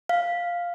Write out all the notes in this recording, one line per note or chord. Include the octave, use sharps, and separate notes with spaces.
F5